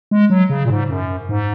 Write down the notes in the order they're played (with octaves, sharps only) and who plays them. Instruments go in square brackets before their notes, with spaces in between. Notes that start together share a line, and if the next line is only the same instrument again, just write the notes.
[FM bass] G#3
F#3
C#3
A#2
G#2
F#2
G#2